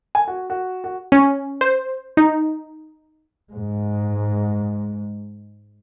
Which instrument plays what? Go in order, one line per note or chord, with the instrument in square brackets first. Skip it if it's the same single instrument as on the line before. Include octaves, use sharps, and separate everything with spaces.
[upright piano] G#5
F#4
F#4
F#4
[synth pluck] C#4
C5
D#4
[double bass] G#2 G#3